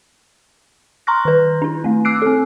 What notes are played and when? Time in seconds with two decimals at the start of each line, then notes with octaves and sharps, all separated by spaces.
1.07 A#5 C6 C#6 F6 F#6 A#6
1.25 D#3 B4
1.62 D4 E4
1.84 A3 C4
2.05 D6 E6 F#6 C7 D7
2.22 C4 A4